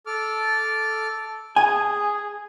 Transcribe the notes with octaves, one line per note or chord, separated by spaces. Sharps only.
A4 D6 F6
G#4 G#5